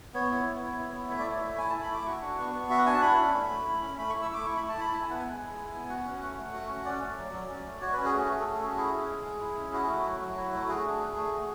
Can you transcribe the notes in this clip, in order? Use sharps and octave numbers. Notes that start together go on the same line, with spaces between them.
B3 C#5
E4
B3
E4
B3
E4
A3 E5
D5
E4 C#5
A3 E5
E4 G#5
A3 A5
B5
E4 D6
F#4 C#6
D4
B3
B3
F#4 E5
F#5
D4 G#5
A5
E4 B5
C#4
A3
A3
E4
C#4
A3 B5
E4 C#6
E6
A3 D6
E4 C#6
A3 B5
A5
E4 B5
E4 A5
G#5
B3 F#5
G#5
G#3
G#3
E4
B3
F#4 F#5
C#4
A3
A3
F#4
C#4
C#4 D5
A3
F#3
F#3
C#4
A3
F#4 C#5
C#4 B4
G#4
A3 F#4
A3 G#4
A4
F#4
A4
C#4 G#4
E4 G#4
C#4
G#3
G#3
E4
C#4
E4 F#4
A3
F#3
F#3
E4
A3
F#4 G#4
D4
A3
A3
F#4